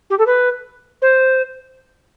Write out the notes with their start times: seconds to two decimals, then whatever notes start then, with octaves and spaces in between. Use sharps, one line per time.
0.10 G4
0.19 A4
0.26 B4
1.02 C5